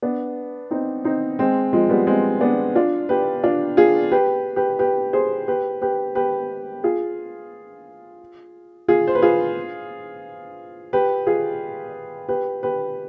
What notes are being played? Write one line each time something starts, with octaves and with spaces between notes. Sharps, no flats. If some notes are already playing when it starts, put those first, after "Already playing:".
B3 D4
C4 D#4
C4 D#4
G#3 C4
F3 G#3
G3 B3
G#3 C4
B3 D4
D4 F4
G4 B4
D4 F4
F4 G#4
G4 B4
G4 B4
G4 B4
G#4 C5
G4 B4
G4 B4
G4 B4
F4 G#4
F4 G#4
C5
B4
F4 G#4
G4 B4
F4 G#4
G4 B4
G4 B4